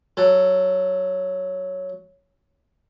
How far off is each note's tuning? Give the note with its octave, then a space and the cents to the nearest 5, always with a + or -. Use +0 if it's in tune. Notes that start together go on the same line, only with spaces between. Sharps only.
F#3 +0 A4 +5